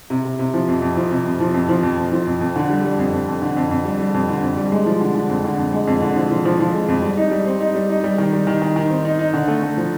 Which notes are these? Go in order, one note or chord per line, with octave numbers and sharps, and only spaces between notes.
C3
C3
C3
F3
F2
F2
F3
C3
F2
F3
F2
F3
F2
F2
F3
F2
F2
D3
G3
G3
F2
F2
F2
D3
F2
F2
G3
G3
F2
D3
F2
G3
G#3
F3
D3
D3
F2
D3
F2
G#3
F2
D3
F3
F3
F3
F3
G#3
F2
G3
D#4
G3
C4
D#4
G3
D#4
G3
D#3
G3
D#3
D#3
D#3
C4
D#4
D#4
D3
A3
A3
F3